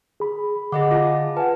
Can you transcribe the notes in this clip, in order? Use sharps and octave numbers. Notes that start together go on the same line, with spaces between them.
G#4 B5
D3 G#4 D#5 F#5 D6
F4 A5
B4 F#5 G#5 A5